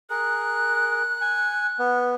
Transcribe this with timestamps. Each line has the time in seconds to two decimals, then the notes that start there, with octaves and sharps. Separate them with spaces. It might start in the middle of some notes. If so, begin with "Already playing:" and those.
0.10 G#4 A#4 F#6
1.21 G#5
1.79 B3